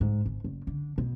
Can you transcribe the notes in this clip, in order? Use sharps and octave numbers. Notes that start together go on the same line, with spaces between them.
G#2
G#1
F#1
D3
B2